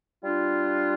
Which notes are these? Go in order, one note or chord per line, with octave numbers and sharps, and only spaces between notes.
G3 D4 F4